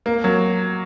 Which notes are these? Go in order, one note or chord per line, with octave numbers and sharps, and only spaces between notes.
A#3
F#3